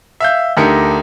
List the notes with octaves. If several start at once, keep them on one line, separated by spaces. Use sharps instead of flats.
E5 F5 G6
D2 D4 D#4 G4 A#4 C#7